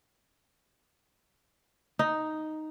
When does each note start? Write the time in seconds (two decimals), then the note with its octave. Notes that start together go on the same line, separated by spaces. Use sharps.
1.99 D#4